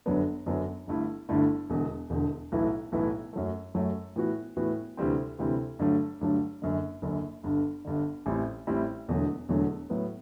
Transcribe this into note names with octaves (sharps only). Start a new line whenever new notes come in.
G1 F#2 F#3 B3 D4
G1 F#2 F#3 B3 D4
G1 G2 D3 A3 E4
G1 G2 D3 A3 E4
E1 E2 D3
E1 E2 D3
B1 A2 E3 B3 E4
B1 A2 E3 B3 E4
F#2 F#3 A3
F#2 F#3 A3
A2 E3 B3 F#4
A2 E3 B3 F#4
D2 C3 E3 G3 C4
D2 C3 E3 G3 C4
G2 D3 F#3 A3
G2 D3 F#3 A3
F#1 F#2 D3
F#1 F#2 D3
G1 G2 D3
G1 G2 D3
A1 A2 G3 C4 E4
A1 A2 G3 C4 E4
E1 E2 D3 F#3 A3
E1 E2 D3 F#3 A3
A2 F#3 B3